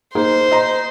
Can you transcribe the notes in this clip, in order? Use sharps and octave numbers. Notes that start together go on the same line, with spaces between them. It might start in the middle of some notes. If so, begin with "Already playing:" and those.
A#3 D#4 G#4 C5
D#5 A#5 C6